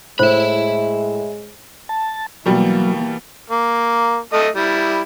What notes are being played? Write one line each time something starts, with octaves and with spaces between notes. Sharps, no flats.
A2 G#3 C5 E5 B5
A5
B2 E3 F#3 G3 A#3
A#3
A3 A4 D#5
G3 E4